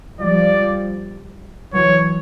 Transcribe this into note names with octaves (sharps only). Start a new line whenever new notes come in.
F3 G3 D5
E3 F#3 C#5